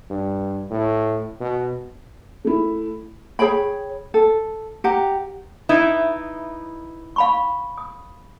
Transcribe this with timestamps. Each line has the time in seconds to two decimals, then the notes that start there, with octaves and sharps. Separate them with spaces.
0.10 G2
0.71 A2
1.41 B2
2.45 A3 E4
3.39 G#4 C#5 G5 B5
4.14 A4
4.84 G4 F#5 A#5
5.69 B3 D#4 E4
7.16 F5 B5 C#6
7.78 D#6